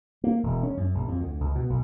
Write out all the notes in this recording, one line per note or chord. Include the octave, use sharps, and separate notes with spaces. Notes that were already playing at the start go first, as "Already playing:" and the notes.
A#3
E1
C#4
F#2
A#1
F2
D2
C#2
B2
B1